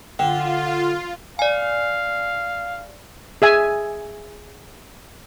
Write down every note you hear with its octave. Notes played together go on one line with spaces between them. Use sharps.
D3 F4 G5
D5 F5 G#5
G#4 E5 G#5